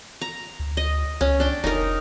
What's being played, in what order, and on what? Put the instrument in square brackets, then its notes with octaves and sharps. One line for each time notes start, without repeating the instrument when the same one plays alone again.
[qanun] A#5
[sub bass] D2
[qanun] D#5
[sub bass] C#2 [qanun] C#4
[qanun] D4 G5
[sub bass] F1 [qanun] D#4 A#4